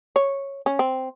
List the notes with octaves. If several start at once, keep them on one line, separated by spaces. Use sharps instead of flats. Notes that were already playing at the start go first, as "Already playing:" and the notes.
C#5
C#4
C4